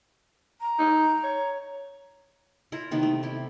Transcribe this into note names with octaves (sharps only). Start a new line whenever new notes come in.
A#5
D#4
C#5
E4 F4 A#4
C3 D#3 B3
A3
E4 G4